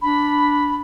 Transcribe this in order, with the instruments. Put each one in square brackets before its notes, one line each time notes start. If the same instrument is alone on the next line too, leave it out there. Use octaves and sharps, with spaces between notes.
[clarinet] D4 [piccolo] B5